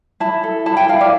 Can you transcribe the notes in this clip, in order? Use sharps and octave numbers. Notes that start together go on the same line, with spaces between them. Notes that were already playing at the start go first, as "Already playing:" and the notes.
E4 A5
A4
E4 A5
G5
E4 F5
D5